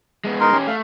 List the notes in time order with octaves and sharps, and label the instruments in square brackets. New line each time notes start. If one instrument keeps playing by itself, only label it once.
[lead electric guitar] G#3 B3
[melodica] D#4 A#4 C6
[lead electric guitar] C#4 G4
[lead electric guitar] A3 [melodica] F5